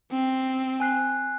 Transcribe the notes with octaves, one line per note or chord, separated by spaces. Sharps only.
C4
G#5 F#6 C7